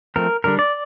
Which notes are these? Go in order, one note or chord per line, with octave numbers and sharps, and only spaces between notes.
F3 A3 C4 A#4
D3 G3 D4 A#4
D5